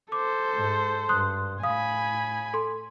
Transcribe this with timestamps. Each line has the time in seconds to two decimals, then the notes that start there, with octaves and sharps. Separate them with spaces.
0.12 A4 C5 D6
0.55 G#2
1.09 G2 C6 D#6 F#6
1.63 A2 F5 G#5 B5 D#6
2.54 A4 C6